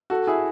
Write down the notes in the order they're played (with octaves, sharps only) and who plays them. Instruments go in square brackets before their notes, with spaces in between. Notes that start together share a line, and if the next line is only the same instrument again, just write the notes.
[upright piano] F#4 A4
E4 G#4